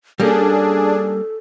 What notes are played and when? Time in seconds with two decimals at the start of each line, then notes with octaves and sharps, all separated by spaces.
0.20 G3 A#3 C#4 D4 G#4 A4